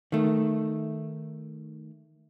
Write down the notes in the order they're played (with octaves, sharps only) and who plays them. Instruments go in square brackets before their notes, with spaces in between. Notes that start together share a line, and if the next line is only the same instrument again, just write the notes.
[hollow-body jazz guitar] D#3 A3